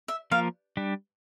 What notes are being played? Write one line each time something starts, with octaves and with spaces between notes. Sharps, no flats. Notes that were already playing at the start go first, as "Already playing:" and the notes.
E5
F3 A#3 F4 A#4 F5
G3 D4 G4